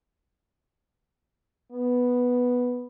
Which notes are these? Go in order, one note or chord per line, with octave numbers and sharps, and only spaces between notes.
B3